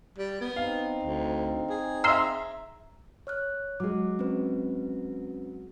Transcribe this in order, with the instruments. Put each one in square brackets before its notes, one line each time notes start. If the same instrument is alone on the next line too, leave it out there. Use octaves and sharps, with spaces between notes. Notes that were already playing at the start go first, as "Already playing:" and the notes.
[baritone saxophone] G3
B3
[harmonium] C4 D#4 [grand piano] F5
[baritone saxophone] D2
G#4
[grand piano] E5 A#5 [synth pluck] F5 C6 E6
[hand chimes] C#5 F6 F#6
[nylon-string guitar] F#3 G#3 [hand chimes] D6
[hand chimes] C4 C#4 B4